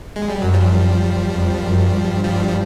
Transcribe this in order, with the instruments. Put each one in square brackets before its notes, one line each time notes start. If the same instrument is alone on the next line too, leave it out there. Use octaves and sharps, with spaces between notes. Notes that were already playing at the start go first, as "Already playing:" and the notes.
[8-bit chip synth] G#3
G3
[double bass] F#2 [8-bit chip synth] F#3
[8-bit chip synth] F3 G3
[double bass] F2
F#2
G2
[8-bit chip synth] F3 G3
F3